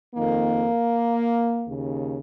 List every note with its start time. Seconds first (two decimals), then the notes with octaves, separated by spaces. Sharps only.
0.15 F2 D#3 A#3
1.66 D#2 C#3